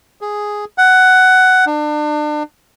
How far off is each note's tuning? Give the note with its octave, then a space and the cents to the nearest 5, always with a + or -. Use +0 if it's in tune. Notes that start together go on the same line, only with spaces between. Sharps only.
G#4 +0
F#5 +10
D4 +35